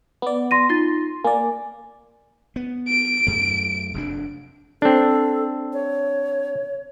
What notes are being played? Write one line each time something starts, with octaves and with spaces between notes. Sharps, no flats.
B3 D5
C6 A#6 D#7
D#4 F4 C6 A6
A#3 D5 G#5
B3
D7
F#2 A3
F1 F2 D4
C4 D4 A4
C#5